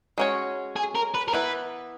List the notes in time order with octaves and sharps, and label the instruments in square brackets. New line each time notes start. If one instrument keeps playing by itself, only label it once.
[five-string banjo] G#3 C#4 F#4 C#5
[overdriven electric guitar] G#4
A#4
B4
A#4
[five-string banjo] E3 B3 E4 [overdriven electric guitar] B4